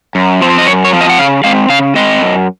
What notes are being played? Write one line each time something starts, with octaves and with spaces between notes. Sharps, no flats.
F#2
F3 C4
D#5
F#2 C#5
C#5
F3 C4
D#5
F#5
C#3 F5
G#3 C4 F5
C#3 F5
G#3 C4 D#5
F#2